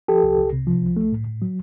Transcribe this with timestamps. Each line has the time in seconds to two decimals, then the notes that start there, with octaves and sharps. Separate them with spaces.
0.08 F3 G4 A4
0.23 C2
0.37 C2
0.53 C3
0.67 F3
0.82 C2
0.97 A3
1.12 A2
1.27 A2
1.42 F#3